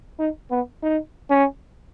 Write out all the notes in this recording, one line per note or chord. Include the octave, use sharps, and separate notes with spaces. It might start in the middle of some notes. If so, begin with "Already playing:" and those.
D#4
B3
D#4
C#4